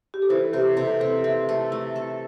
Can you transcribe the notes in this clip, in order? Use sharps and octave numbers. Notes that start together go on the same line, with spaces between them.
G4
A4
E3 C5
C3 G4
C3 A4
C4 A4
C4 E5
A3
A3
A4